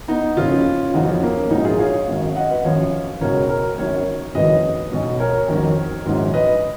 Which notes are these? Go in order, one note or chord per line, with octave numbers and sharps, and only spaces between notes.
B3 D#4
F#1 F2 C#3 C#4 F4
F#1 F2 F3 D#4 F#4
C#4 F4
A#3 C#4
A#1 G#2 F#3 D#4 F#4
F4 G#4
C#5 F5
G#1 F#2 D#3 F#3
D#5 F#5
B4 D#5
G#1 F#2 F3 C#5 F5
C#2 B2 F#3 A#4 C#5
A#4 C#5
G#1 F#2 D#3 F#3 A#4 C#5
F#1 F2 D#3 F#3 B4 D#5
B1 B2 F#3
A#4 C#5
F2 D#3 F#3
A#1 G#2 D#3 F#3
B4 D#5